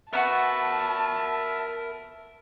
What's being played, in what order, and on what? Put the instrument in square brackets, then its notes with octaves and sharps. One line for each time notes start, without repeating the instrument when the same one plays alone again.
[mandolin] B3 D4 F#4 [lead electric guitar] A#4 B5 [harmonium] E5 [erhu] A5